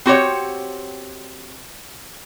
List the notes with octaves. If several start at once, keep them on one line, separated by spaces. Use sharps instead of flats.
C4 F#4 G4 C#5